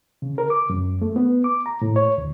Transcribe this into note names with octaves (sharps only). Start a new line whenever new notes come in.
C#3
A#4
D6
F#2
A3
B3
D6
A#5
A2
C#5
D2